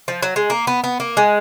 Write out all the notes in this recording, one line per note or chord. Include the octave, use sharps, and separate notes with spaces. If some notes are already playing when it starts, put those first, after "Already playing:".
F3
F#3
G#3
A#3
B3
B3
A#3
G#3